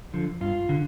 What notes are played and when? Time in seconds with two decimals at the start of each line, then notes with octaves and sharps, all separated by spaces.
0.14 D3 F3
0.41 G2 F4
0.69 D3